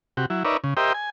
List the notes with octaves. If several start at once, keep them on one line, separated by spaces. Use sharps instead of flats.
C3 F#4 G4
F#3 E4
D#4 A#4 B4 C#5 D5 E5
C#3
G4 A#4 C5 D#5 E5 G5
G#5